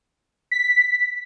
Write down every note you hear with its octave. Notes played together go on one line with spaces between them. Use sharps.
B6